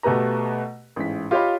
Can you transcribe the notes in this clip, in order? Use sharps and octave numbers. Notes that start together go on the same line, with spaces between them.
B2 A3 G4 B4 A#5
A1 G#2 B6
F4 G4 C#5 D#5 F5 B5